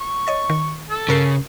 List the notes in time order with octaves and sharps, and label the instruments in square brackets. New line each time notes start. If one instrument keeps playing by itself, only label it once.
[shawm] C#6
[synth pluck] C#5 D#5 A6
D#3
[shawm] A4
[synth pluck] G2 A#4 C7 [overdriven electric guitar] C#3